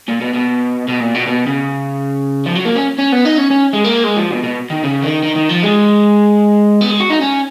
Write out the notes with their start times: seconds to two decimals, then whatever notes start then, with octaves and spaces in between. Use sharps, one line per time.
0.08 A#2
0.21 B2
0.34 B2
0.88 B2
1.00 A#2
1.15 B2
1.27 B2
1.47 C#3
2.46 F3
2.55 F#3
2.65 A#3
2.75 C#4
2.98 C#4
3.12 B3
3.25 D#4
3.38 C#4
3.51 C#4
3.73 G#3
3.84 A#3
4.04 G#3
4.17 F3
4.30 B2
4.44 B2
4.70 D#3
4.84 C#3
5.02 D#3
5.23 D#3
5.35 D#3
5.49 F3
5.63 G#3
6.81 B3
6.90 G#3
7.00 F#4
7.10 D#4
7.21 C#4